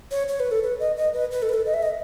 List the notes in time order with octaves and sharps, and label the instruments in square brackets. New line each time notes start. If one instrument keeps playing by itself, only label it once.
[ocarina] C#5
C#5
B4
A4
B4
D#5
D#5
B4
B4
A4
B4
A4
D#5
E5
D#5